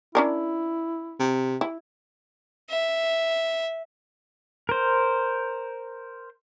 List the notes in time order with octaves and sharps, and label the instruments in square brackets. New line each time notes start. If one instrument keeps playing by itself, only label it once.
[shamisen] C#4 D4 A#4 [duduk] E4
[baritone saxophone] C3
[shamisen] E4
[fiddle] E5
[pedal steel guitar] A#4 C5